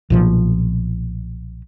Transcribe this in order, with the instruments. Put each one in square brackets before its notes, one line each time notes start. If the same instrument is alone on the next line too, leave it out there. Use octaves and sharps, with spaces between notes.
[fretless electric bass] B1 A#2 F3